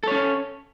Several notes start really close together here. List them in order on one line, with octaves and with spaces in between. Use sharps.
A4 C#5 C#4